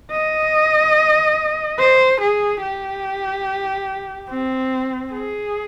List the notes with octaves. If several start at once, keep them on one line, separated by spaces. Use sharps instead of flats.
D#5
C5
G#4
G4
C4
G#4